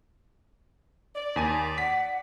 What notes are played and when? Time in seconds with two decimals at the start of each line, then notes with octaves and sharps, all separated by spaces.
1.15 D5
1.36 D#2 G#5 D#7
1.78 F#5 B6